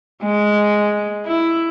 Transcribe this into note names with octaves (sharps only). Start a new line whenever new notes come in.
G#3
E4